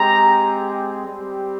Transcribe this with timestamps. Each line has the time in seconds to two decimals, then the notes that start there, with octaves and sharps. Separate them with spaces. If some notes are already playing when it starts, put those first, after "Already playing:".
Already playing: G#3 C4 G4 A#5
1.06 G3 C4 G4